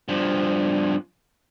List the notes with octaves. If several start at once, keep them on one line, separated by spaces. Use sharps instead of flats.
G2 F3